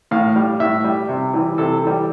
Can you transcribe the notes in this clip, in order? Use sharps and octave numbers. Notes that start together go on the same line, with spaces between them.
A2 F5
G3
A2 E5
G3
C3
E3 G3
C3 A4
E3 G3